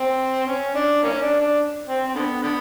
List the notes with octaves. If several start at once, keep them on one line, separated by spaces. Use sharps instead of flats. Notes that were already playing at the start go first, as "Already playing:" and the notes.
Already playing: C4
C#4
D4
A#3 C#4
D4
D4
C4
C4
D3 B3
D3 B3